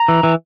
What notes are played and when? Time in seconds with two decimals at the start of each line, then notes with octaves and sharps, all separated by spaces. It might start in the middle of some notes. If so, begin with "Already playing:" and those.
Already playing: A#5
0.08 E3
0.23 E3